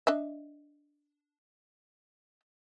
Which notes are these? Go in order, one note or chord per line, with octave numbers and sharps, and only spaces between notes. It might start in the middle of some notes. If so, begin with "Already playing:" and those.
D4 D#5 E5